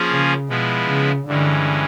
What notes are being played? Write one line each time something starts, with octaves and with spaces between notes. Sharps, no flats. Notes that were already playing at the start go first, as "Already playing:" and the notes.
Already playing: F3 A#3 C#4 F4 G#4
C#3
B2 F3 G#3 B3 E4
C#3
G2 D3 E3 G#3 C#4